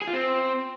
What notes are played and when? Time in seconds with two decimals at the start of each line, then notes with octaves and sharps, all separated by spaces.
0.02 G#4
0.07 F4
0.13 C4